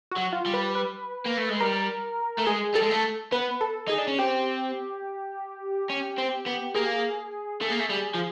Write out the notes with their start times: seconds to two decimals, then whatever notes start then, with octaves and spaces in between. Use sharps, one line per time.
0.11 F#4
0.17 F#3
0.33 F4
0.46 G3
0.54 B4
0.75 B4
1.25 A#3
1.37 A3
1.49 G#3
1.61 G3 A#4
2.39 A3
2.46 G#3 G#4
2.74 G3 A4
2.83 G#3
2.90 A3
3.32 B3 B4
3.61 A4
3.88 D#4 G#4
3.98 D4
4.08 C#4
4.19 C4 G4
5.90 C#4
6.18 C4
6.46 B3
6.75 A#3 G#4
7.61 A3
7.70 A#3
7.79 A3
7.90 G3
8.14 F3